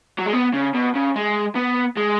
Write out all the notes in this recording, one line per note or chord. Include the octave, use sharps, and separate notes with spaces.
F#3
G#3
B3
C#3
B2
C#3
G#3
B3
G#3